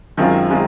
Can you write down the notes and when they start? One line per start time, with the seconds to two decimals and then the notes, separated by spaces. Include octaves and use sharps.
0.17 F#2 D#3 G#3 C4 F4
0.50 D#3 G#3 C4 F4